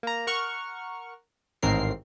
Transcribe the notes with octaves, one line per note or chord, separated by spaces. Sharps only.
A#3 A#5
A#4 F#5 C#6 F6
A1 G#2 D#3 C4 A#4 C7